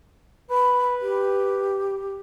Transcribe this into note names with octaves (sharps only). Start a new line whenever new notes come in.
B4 B5
G4